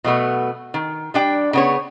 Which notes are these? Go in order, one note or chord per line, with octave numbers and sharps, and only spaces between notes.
B2 F#3 A3 B3
D#3
G3 D4 G5
C#3 B3 C#5